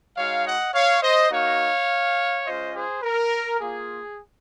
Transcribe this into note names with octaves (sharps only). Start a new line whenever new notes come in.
G#3 D#4 F#4 C#5 F5
D#5 F#5
C#5 F5
C5 D#5
A#3 D#4 F#4 C#5 F5
G#3 C#4 F4 C5 D#5
G#4 C5
A#4
A#3 F4 G#4